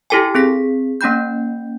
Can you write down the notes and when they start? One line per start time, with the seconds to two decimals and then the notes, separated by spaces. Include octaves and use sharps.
0.10 E4 G4 A4 G5 G#5
0.35 C4 G#4 B6
1.01 A#3 C#4 G5 B5 G6